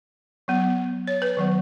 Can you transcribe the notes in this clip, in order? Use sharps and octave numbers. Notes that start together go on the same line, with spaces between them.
F#3 B3
C#5
B4
D#3 F#3 B3